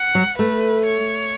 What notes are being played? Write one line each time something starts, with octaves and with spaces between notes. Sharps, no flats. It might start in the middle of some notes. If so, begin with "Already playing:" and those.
Already playing: F#5
F#3
A3 B4
C#5